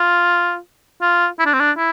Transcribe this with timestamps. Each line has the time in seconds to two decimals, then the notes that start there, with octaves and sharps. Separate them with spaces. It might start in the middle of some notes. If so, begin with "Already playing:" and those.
Already playing: F4
1.02 F4
1.39 E4
1.46 D4
1.53 C4
1.60 D4
1.77 E4